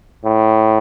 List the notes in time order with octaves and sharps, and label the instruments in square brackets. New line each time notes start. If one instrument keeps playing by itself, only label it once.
[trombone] A2